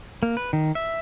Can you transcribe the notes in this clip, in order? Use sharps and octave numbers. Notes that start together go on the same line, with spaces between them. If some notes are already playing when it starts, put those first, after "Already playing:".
A#3
B4
D#3
E5